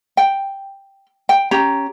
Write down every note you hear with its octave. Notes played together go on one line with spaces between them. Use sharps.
G5
G5
C#4 G4 A#5